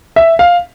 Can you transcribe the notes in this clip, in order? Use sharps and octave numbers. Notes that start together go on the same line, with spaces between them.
E5
F5